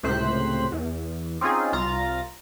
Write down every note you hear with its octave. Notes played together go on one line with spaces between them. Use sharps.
C#2 A2 C3 C5 F#6 B6
E2
C4 C#4 D#4 F4 G#4
C2 F4 A#5 A6